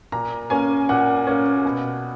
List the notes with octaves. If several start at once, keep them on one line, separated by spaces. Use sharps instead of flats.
A#2 A#5
A#3 C#4 G#5
A#2 F#5
A#3 C#4
B2